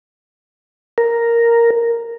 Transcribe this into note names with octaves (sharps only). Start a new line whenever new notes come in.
A#4